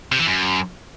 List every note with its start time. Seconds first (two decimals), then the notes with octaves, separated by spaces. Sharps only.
0.12 C3
0.19 E3
0.26 F#2